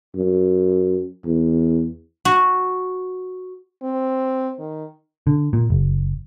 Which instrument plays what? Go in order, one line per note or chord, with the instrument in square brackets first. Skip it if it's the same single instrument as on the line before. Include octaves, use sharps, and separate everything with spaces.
[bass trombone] F#2
E2
[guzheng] F#4
[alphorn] C4
D#3
[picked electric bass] D3
A#2
F#1